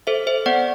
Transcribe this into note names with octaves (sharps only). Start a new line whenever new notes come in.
A4 C5 E5
C5 E5
B3 D5 F#5